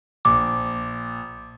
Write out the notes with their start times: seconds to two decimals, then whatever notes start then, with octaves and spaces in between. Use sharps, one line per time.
0.25 A#1 D6